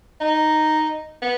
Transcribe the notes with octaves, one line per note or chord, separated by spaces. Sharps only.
D#4
B3